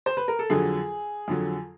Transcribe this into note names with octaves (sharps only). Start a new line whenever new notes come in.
C5
B4
A#4
A4
F2 D3 F#3 G#4
F2 D3 F#3